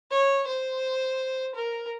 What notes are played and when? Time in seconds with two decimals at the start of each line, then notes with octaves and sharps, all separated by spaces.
0.11 C#5
0.47 C5
1.55 A#4